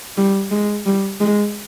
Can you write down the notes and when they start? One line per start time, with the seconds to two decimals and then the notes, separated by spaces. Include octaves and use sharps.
0.18 G3
0.51 G#3
0.86 G3
1.20 G#3